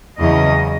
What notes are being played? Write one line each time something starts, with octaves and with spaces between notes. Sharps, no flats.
E2 C#3 F#3 D#5